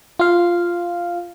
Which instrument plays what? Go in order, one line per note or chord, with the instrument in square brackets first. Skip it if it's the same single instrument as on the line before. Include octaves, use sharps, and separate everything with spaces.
[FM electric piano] F4 F5